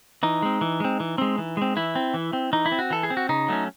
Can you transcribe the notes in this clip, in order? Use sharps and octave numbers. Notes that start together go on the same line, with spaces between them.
E3 D#4
G#3 C4
E3
G#3 C4
E3
G#3 C4
E3
G#3 C4
E3 E4
C4
E3
C4
E3 D#4
E4
C4
F#4
E3 A4
G#4
C4
F#4
C#3 D#4
F#3 A3 C#4